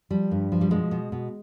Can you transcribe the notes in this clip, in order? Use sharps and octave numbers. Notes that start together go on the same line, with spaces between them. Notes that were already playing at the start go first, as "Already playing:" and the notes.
F3 G3
G2
F3
G3
B2 G#3
B2
B2